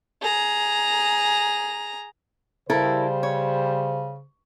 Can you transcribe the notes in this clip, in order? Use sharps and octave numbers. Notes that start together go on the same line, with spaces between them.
G#4 A#5
C#3 G3 E4 A4 A#4 C5
C#5